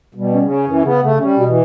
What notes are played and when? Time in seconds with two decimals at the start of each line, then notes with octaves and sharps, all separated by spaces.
0.15 B2 G3
0.32 C#4
0.42 C#3
0.49 C#4
0.67 F#2 E3
0.85 C#3 B3
1.03 C#3 A3
1.20 G3 C#4
1.38 B2
1.47 E3